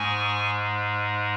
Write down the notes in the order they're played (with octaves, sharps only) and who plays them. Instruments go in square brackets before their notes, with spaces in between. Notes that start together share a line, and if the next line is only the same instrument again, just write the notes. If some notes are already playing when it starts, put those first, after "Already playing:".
Already playing: [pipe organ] G#2 G#3 G#5 C#6